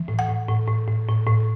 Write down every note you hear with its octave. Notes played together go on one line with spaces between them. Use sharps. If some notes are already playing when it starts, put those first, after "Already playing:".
Already playing: E3
A2
F#5
A2
A2
A2
A2
A2
A2